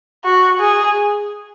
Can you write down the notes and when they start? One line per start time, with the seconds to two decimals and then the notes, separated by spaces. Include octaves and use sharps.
0.24 F#4
0.59 G#4